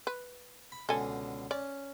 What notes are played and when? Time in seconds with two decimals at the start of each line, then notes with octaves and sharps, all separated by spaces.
0.07 B4
0.72 B5
0.89 C#2 B2 D3 A4 G#5
1.51 C#4 D5